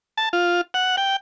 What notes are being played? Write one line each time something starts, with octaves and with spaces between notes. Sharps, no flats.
A5
F4
F#5
G5